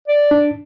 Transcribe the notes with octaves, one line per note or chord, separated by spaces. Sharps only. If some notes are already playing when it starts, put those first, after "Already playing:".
D5
D4